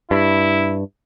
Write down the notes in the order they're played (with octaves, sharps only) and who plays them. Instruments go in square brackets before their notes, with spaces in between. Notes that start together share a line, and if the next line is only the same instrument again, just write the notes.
[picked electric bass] G2 [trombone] E4